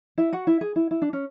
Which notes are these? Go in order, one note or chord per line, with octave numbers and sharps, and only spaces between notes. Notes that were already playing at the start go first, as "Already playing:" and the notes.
E4 E5
F#4 F#5
E4 E5
G#4
E4
E4
D4
C#4